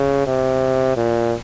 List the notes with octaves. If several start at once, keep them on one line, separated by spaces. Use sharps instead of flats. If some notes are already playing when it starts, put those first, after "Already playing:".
Already playing: C#3
C3
A#2